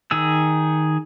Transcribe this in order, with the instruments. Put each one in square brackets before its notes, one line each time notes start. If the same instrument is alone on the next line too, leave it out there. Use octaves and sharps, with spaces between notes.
[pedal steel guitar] D#3 G#4 E6